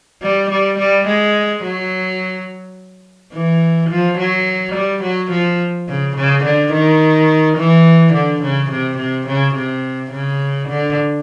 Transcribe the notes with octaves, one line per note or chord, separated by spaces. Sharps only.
G3
G3
G3
G#3
F#3
E3
F3
F#3
G3
F#3
F3
C#3
C#3
D3
D#3
E3
D3
C#3
C3
C3
C#3
C3
C#3
D3